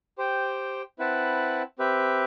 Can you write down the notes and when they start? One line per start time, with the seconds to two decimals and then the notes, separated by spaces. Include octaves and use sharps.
0.18 G4 C5 G5
0.99 C4 E4 B4 F#5 A5
1.79 C4 G4 B4 E5